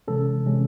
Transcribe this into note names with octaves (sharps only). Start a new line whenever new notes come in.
C3 E3 G#3 C#4 A4
C3 E3 G#3 C#4